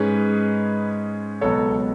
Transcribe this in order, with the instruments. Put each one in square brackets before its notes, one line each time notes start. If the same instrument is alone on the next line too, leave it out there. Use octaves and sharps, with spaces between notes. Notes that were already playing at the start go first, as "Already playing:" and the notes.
Already playing: [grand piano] G#2 G#3 C#4 G#4 B4
C#2 B2 F#3 A4 C#5